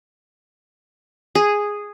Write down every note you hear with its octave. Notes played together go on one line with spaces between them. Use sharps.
G#4